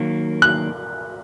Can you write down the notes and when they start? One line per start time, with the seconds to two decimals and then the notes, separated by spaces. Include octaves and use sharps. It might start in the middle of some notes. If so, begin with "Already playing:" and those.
Already playing: D#3 F#3 A#3
0.42 F#6